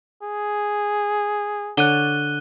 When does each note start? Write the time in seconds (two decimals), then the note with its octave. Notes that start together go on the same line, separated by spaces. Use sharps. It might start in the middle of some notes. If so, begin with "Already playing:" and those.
0.23 G#4
1.77 D3 C#5 D5 F#6 D#7 G7